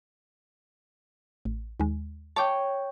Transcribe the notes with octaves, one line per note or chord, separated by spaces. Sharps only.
A1
D#2 G#3
C#5 G5 A5 D6